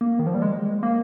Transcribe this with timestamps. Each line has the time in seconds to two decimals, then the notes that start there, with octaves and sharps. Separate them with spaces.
0.01 A#3
0.19 D#3
0.27 F3
0.34 G3
0.42 G#3
0.83 A#3